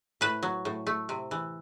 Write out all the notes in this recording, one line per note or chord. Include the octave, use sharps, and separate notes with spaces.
A2 B4
F#3
A2
A3
C3
E3